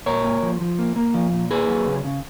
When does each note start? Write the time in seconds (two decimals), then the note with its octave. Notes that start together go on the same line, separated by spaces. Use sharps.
0.06 A#2 A#4 C#5
0.24 A#3
0.43 F3
0.61 F3
0.79 A#3
0.96 A#3
1.14 F3
1.33 A#2
1.51 A#3 G#4 B4
1.68 F#3
1.87 C#3
2.04 C#3